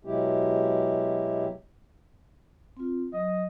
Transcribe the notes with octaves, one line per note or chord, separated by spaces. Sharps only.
B2 F#3 G#3 E4 G4
C4 F4
F#3 D#5